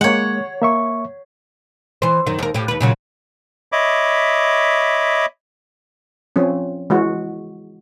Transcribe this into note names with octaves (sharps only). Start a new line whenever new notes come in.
G#3 A#3 C#5 F#5
A#3 E5 C#6
E3 C5
F#2 D#3
D#2 A#4
A2 G4
D#2 B4
A#2 C#3 F#3
C#5 D#5 E5 B5 D6
F3 C4 C#4
E3 G#3 F#4